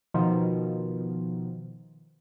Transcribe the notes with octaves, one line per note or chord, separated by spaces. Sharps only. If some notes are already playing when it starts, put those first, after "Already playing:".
B2 D#3 F3